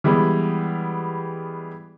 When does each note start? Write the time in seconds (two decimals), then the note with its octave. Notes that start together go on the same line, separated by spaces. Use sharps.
0.04 E3 G3 G#3 B3